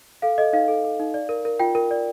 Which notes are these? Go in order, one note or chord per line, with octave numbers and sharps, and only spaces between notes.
A4 F5
A4 D#5
D#4 F5
A4
A4
D#4
D5
A#4
A#4
F4 G5
A#4
D5